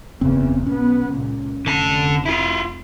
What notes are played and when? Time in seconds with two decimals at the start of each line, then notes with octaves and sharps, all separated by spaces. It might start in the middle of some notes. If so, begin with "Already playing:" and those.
0.21 F#1 E2 C#3 C4
0.66 B1 B3 C#4
1.11 C#2 A#2
1.66 F1 D3 A5
2.26 E4 F4